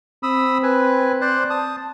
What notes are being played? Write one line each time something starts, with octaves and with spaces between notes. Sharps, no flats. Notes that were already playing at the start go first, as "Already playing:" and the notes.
C4 B5 D#6 E6
B4 G#5
C5 D5 F#6
A5 D#6